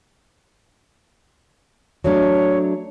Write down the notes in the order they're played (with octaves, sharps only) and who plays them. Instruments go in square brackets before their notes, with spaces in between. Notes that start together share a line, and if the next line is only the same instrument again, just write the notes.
[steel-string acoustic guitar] F#3 A3 D4 [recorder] C#5